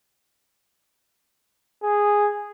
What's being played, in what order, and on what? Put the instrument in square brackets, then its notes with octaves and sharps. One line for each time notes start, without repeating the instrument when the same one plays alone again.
[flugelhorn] G#4